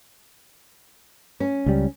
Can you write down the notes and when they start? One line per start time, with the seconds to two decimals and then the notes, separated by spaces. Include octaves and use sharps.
1.40 C#4
1.66 C#2 G3